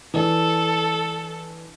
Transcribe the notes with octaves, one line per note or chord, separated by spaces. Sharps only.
E3 D4 A4